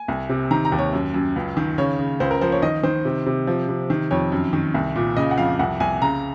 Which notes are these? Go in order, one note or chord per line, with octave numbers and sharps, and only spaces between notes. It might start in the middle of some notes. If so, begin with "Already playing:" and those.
Already playing: G#5
C2
C3
D#3 A#5
A#5
D#2
C#5
F#2
F#2
C#2
D#3
C#3 C#5
C#3
C#2 C5
A#4
F3 C5
C#5
D#3 D#5
D#3 C5
C3
C3
F3
C3
D#3
F2 C#5
F#2
D#3
C2
A#2
C#3 D#5
F#5
F2 F5
C2 F#5
C2 G#5
C#3 A#5